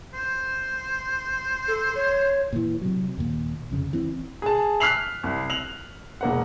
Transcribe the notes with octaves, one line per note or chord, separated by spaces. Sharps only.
C5
A4
C#5
A#2 E3
C3 F#3
D#2 A#2
C2 F2 C#3
E3 C4
G#4 A5
F6 F#6 B6 C7 F7 F#7
C2
F7 F#7
E1 A#3 F#5